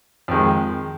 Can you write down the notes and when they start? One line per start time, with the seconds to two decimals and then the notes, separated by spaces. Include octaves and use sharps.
0.28 F2 D#3 G#3